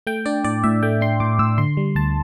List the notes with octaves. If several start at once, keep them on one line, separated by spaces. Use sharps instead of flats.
A3 G5
D4 D5
A2 D5
A2 E5
A3 G5
D4 C6
A2 D6
A2 E6
D3 C6
G3
D2 A5